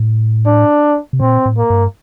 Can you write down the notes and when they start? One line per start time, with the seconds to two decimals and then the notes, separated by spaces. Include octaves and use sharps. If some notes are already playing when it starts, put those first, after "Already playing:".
Already playing: A2
0.46 D4
1.13 C3
1.20 A#2 C4
1.46 A2
1.58 A#3
1.70 G2